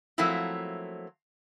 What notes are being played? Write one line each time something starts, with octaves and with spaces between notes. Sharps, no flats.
F3 F#3 A3 A#3 C4 E4